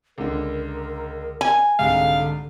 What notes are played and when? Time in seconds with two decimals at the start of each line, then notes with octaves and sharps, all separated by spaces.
0.18 C#2 D3 A#4
1.41 G#5
1.79 C2 G#2 D3 F5